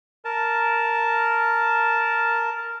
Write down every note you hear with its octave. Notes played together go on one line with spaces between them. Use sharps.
A#4 A5